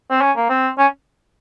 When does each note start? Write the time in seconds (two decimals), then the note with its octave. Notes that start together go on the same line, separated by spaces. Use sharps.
0.11 C4
0.21 C#4
0.36 A#3
0.49 C4
0.78 C#4